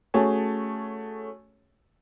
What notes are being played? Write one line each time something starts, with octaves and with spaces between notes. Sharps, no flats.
A3 C#4 F#4 G#4 C#5 A5